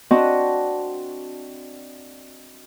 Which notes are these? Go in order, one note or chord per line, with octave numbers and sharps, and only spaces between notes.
C4 D4 F#4 D#5 A5